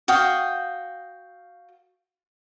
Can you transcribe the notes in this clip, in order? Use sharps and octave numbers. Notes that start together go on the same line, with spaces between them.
F#4 F5 G5 D#6